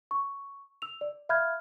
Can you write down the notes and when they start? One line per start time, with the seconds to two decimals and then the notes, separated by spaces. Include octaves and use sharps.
0.11 C#6
0.82 E6 F7
1.01 D5
1.29 E5 F5 B5 F6 G6 G#6